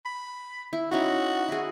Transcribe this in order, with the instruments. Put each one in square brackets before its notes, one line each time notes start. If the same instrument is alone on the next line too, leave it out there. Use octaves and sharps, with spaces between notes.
[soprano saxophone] B5
[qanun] E4
[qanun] C#4 D#4 E4 [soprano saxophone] F#4
[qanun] E4 G#4